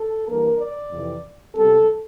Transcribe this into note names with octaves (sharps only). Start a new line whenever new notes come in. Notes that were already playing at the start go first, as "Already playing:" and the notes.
Already playing: A4
G2 E3 A#3 D4 A#4
D5
F2 C3 E3
C3 G3 C4 A4